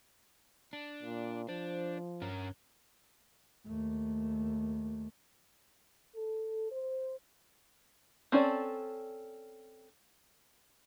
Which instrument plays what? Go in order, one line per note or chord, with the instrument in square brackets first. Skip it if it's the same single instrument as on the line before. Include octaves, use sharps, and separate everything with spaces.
[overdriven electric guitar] D4
[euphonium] A#2
[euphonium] F3 [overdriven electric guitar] D4 [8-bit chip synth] C5
[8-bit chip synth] G2 [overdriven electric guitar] C#4 A#4
[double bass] D#2 A3
[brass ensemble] A4
C5
[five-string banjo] C4 C#4 A4 D5